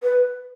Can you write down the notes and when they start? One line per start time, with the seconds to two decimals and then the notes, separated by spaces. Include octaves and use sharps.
0.03 B4